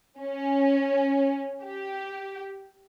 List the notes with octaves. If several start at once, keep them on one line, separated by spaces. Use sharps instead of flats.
C#4
G4